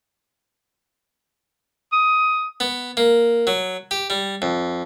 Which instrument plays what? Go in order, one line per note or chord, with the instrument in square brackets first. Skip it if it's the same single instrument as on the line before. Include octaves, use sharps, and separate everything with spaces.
[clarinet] D#6
[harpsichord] B3
A#3
F#3
G4
G3
F2